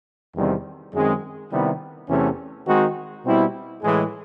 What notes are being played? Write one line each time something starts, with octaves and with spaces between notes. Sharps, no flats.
E2 C3 D#3 G3 C4
F#2 D#3 G#3 C4
C3 D#3 G3 B3 E4
E2 C3 E3 A3 C#4
D#3 G#3 C4 D#4 F#4
B2 G3 C4 E4
A2 E3 G#3